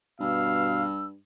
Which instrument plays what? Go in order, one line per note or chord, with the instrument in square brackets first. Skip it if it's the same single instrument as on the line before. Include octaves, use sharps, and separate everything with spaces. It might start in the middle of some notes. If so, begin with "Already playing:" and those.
[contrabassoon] G2 [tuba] B2 [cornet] F5 [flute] E6